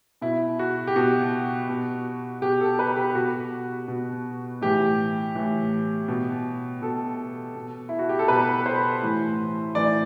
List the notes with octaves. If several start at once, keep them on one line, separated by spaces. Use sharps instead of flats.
B2 E4
F#4
G4
B2 F#4
B2
B2 G4
A4
B4
G4
B2 F#4
B2
A2 E3 G4
A2 E3
B2
B2 A4
B2
E4
F#4
G4
A4
B2 B4
C5
A2 E3
A2 E3 D5